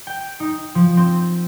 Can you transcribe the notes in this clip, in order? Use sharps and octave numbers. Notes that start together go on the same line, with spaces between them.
G5
D#4
F3
C4